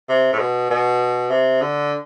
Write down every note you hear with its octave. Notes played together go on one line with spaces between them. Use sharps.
C3
A2
B2
B2
C3
D3